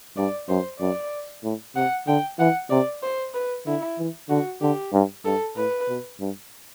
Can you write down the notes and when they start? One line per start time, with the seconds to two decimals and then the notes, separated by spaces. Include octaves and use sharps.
0.17 G2 D5
0.49 F#2 C5
0.80 F#2 D5
1.44 A2
1.76 C3 F#5
2.07 D3 G5
2.39 E3 F#5
2.70 C3 D5
3.03 C5
3.34 B4
3.66 D3 E4
3.98 E3
4.29 D3 F#4
4.61 D3 G4
4.93 G2
5.25 G2 A4
5.57 A2 B4
5.88 B2
6.20 G2